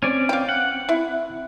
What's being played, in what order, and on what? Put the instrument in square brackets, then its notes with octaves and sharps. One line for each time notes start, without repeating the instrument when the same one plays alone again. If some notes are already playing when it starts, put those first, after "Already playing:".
[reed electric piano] C4 G#6 [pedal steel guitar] C#4 D5
[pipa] F5 G5
[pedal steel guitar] F#5
[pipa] E4